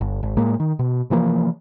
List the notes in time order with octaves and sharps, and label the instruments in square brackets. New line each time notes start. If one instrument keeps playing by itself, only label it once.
[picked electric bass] G1
G#1
A2 G#3 A#3
D#3
B2
C3 E3 F3 A#3